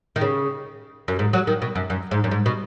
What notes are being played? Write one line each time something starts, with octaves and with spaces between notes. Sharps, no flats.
D#3
C#3
F#2
G#2
F#3
D#3
B2
F#2
F#2
G#2
F#2
G#2
B2